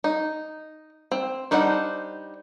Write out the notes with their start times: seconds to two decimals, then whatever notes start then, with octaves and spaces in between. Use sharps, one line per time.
0.04 D#4
1.12 C4
1.51 G3 D4 D#4 C5 F#5